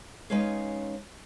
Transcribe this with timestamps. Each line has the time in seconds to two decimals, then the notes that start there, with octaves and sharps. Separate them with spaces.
0.30 G#3 C#4 D#4 B4 C#5 F5